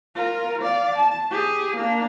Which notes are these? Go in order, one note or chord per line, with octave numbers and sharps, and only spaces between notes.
F4 A#4
D5 F5
A5
G4 G#4
A#3 D4